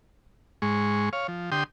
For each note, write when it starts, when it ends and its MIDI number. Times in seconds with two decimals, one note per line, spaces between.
0.62 1.09 44
0.62 1.09 56
0.62 1.09 85
1.13 1.27 73
1.13 1.27 77
1.28 1.50 53
1.52 1.64 50
1.52 1.64 67
1.52 1.64 79
1.52 1.64 84
1.52 1.64 87